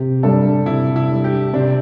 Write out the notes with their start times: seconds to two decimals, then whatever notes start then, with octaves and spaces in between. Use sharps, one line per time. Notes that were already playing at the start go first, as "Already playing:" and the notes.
Already playing: C3 G4
0.23 G3 D4 A4
0.66 C3 E4
0.96 E4
1.10 G3 D4
1.24 G4
1.53 C3 D4
1.60 C4